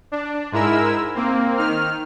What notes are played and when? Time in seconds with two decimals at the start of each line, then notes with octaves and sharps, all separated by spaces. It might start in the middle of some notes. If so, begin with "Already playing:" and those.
0.12 D4
0.52 G#2 G#3 E4 A#4 E6
1.15 A#3 C4
1.58 D#3 F6